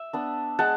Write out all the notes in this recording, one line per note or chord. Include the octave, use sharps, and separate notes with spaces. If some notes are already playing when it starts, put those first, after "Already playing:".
Already playing: E5
B3 D4
G#3 F#5 A5